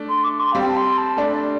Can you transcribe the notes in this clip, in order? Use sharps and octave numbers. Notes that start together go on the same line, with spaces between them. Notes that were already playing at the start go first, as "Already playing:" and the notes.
Already playing: A3 D4
C6
D6
C6
F5
G3 C4 G5
A5
C6
A5
A3 D4 D5